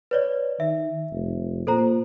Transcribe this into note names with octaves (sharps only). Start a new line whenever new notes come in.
B4 C#5 D5
D#3 E5
F1
A#2 A4 C5 A#5